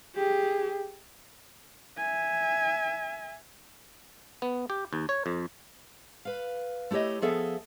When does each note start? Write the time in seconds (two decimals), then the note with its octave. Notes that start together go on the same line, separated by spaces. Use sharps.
0.16 G4 G#4
1.97 E5 G#5
4.42 B3
4.70 G4
4.93 D#2
5.09 C#5
5.26 F2
6.25 B4 F5
6.91 A3 E4 G4 C#5 D#5
7.22 F3 B3 G#4 A4 E5 F5